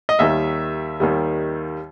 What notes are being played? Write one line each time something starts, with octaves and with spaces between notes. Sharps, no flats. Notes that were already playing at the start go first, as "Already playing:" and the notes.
D#5
D#2 D#3 G3 E5
D#2 D#3 G3